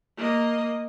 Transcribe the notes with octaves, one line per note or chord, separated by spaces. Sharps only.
A#3 D#5